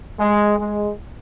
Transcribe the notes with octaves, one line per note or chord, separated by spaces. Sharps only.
G#3
G#3